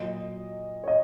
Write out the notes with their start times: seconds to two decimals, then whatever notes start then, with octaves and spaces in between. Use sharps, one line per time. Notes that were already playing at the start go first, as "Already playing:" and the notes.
Already playing: A#2 F#3 D#5
0.84 C#5
0.88 D#5